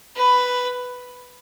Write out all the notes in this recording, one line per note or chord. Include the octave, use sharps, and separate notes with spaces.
B4